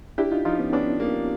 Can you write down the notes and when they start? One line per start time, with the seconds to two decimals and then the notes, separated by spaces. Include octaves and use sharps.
0.18 D4 E4 G4
0.32 D#4 F4
0.45 F3 D#4 F4
0.59 B3 C#4
0.73 B3 C#4 D4
1.00 A#3